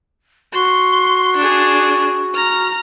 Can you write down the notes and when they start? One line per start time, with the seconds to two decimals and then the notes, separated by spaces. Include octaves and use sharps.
0.53 F#4 C6
1.38 D4 G#4
2.34 A#5 F6